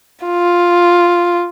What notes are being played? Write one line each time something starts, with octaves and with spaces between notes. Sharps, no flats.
F4